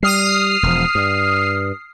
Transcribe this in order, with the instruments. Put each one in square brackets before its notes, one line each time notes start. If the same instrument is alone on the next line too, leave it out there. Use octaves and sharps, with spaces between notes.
[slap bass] G3 [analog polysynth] D#6 F6 C7
[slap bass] E1 F3
G2